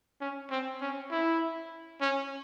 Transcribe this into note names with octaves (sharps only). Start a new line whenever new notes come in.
C#4
C4
C#4
E4
C#4